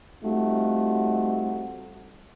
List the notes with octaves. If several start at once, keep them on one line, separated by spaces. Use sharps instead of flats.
G3 A3 C4 D#4 F4 F#4